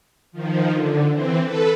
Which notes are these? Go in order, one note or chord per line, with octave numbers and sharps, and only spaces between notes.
D#3 F3
D3
E3 C4
A4 B4